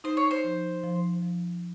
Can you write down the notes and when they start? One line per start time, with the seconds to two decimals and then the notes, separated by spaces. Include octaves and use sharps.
0.04 D#4 C5
0.17 C#5
0.31 C5
0.44 F3
0.84 F3
1.22 F3